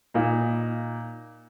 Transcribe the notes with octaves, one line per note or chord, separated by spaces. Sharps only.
A#2 D#4